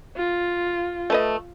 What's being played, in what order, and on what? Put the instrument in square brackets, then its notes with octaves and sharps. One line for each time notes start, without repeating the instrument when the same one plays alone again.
[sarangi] F4
[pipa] A3 B4 D#5